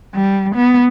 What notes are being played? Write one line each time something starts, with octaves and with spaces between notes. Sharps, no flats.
G3
B3